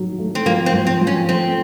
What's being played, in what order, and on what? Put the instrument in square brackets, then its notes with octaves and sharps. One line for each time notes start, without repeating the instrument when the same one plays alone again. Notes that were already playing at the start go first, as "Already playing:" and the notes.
Already playing: [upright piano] A2 D#3 F#3
A3
[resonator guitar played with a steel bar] C4
[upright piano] F3 [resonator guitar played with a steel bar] A#3
[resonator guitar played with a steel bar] C4
[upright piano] F3
[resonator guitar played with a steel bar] C4
[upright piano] F3
[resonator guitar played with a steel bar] C#4
[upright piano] A3 [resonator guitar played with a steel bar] C4